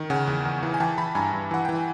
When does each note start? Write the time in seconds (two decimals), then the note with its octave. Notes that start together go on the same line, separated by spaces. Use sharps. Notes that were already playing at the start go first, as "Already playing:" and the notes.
Already playing: D#3
0.10 C#3 F#5 G#5
0.27 E2
0.45 E2
0.63 E3
0.74 G#5
0.80 E3 G5 A5
0.98 E3 A5 B5
1.15 G2 G#5 A#5
1.33 G2
1.51 E3 F#5
1.65 E3 G5
1.75 G#5